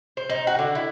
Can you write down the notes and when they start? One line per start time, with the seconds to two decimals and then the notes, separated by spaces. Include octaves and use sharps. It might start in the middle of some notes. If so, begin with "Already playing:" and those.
0.17 C5
0.29 D#4
0.47 F#4
0.59 D3
0.75 E4